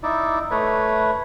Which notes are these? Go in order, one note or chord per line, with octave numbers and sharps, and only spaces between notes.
D#4 E4 D5
A3 B4 C#5